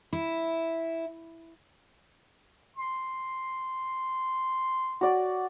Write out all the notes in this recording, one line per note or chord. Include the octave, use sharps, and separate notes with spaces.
E4
C6
F#4 D5